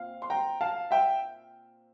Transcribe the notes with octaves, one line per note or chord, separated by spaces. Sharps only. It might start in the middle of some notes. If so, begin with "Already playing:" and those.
Already playing: A#2 C4 F5
C6
G5 A#5
F5 A5
E5 G5